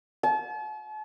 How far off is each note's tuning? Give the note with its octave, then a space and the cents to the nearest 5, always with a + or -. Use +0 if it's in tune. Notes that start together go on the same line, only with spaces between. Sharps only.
A5 -40